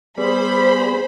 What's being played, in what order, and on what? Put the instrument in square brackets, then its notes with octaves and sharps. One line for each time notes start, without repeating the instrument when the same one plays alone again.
[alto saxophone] G3 [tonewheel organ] B3 G#4 [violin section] C5 B5